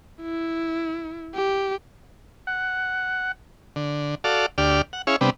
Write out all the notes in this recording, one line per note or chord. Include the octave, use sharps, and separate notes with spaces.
E4
G4
F#5
D3
F#4 A4 D5 F5
D2 G4 D5 F6
F#5
C#4 E4 G#4 C#5 F5
C3 G3 B3 D4